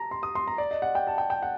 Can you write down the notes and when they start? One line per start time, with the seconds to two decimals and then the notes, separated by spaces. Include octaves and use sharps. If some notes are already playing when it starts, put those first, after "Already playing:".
Already playing: A5 A#5
0.11 C6
0.23 D#6
0.35 C6
0.47 A#5
0.58 D5
0.71 D#5
0.82 F#5
0.95 G5
1.07 A5
1.18 G5
1.30 G5
1.42 F#5